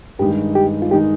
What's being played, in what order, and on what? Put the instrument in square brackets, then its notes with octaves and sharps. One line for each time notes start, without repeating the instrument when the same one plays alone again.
[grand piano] G2 D#3 G#3 D#4 [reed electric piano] G4
[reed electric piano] G4
F4
[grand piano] D#3 G#3 D#4 [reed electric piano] G4